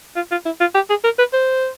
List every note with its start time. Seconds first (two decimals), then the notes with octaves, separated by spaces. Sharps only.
0.16 F4
0.32 F4
0.46 E4
0.61 F4
0.75 G4
0.90 G#4
1.04 A#4
1.19 B4
1.33 C5